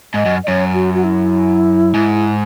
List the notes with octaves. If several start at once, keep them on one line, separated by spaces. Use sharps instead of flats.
G#2 D#5
F#2
D#5
F#2 C#5
F#4
F#4
E4
G#2